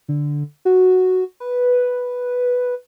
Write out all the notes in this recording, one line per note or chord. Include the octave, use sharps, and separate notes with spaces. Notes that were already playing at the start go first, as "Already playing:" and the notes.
D3
F#4
B4